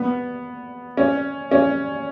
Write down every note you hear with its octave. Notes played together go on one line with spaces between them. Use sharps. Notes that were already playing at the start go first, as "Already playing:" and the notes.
Already playing: B3
C#4
C#4